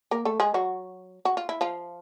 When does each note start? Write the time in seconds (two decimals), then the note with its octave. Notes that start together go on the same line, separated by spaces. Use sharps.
0.11 A#3 A#4
0.25 A3 A4
0.40 G#3 G#4
0.54 F#3 F#4
1.25 F#4
1.37 F4
1.49 E4
1.61 F3 F4